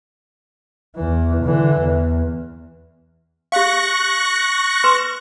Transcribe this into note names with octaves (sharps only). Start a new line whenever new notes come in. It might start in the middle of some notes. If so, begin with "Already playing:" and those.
E2 E3
D3 E3
E2
G4 F5 C#6 F#6 A#6
B4 C6